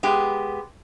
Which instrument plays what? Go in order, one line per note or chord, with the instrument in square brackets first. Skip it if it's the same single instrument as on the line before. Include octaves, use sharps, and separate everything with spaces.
[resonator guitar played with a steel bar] G#3 B3 G4